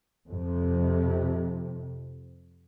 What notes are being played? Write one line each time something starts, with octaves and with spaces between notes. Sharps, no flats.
F2 C3